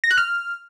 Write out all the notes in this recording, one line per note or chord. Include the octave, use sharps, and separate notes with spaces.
A#6
F#6
F6